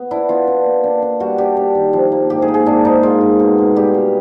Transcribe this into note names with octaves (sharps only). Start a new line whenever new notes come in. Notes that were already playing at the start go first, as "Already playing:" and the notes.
Already playing: B3
D4 E4
B3 F4
D4
A#3
D4
D4
G3 F#4
D4 G4
D4
D#3
F3
A#3
G#2 G4
G#4
A#3
G#4
G#2 D4
G#2 D#4
G#2 F4
G#2
B2
B2
G3 G4
B2